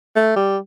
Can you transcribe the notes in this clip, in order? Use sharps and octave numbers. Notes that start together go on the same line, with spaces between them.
A3
G3